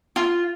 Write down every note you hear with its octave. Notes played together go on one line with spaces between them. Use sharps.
F4